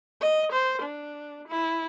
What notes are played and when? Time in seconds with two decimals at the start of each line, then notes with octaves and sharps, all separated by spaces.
0.21 D#5
0.52 C5
0.82 D4
1.48 E4